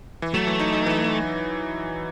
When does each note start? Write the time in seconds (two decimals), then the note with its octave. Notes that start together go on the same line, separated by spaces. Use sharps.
0.22 E3
0.34 F#3 A3
0.47 E3
0.59 D#4
0.73 D#4
0.86 E3